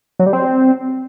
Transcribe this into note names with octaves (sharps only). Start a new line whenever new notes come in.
F#3
G3
C4